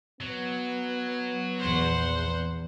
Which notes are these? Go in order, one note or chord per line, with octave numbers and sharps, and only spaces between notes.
F#3 B3
A#1 E2 C5 F#5